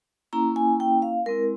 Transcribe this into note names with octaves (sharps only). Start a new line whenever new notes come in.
A#3 C#4 E4 A#5
G#5
G5
F5
G#3 C4 E4 A#4